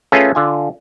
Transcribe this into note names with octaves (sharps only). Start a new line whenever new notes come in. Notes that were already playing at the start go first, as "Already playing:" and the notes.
A3 C#4 F4 G#4 A4 B4
D3 F4 G#5